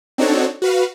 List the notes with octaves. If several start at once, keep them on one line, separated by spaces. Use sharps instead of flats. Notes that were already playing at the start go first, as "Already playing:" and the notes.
C4 D4 D#4 F#4 A4 C#5
F#4 B4 F5